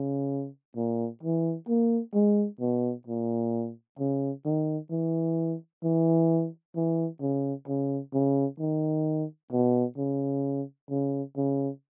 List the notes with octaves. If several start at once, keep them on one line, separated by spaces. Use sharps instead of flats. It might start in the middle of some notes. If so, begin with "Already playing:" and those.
Already playing: C#3
A#2
E3
A#3
G#3
B2
A#2
C#3
D#3
E3
E3
E3
C#3
C#3
C#3
D#3
B2
C#3
C#3
C#3